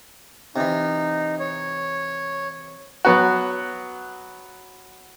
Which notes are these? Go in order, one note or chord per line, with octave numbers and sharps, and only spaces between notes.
C3 E3 D#4
C#5
F#3 B3 F#4